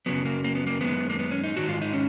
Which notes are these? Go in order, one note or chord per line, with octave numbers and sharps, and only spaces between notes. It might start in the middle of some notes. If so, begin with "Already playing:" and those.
F#2 C#3 F#3 B3
A#3
A#3
B3
A#3
F#2 D#3 G#3 B3
A#3
B3
C#4
D#4
G#2 D#3 G#3 F#4
F4
D#4
C#4